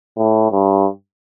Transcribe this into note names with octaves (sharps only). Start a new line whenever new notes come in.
A2
G2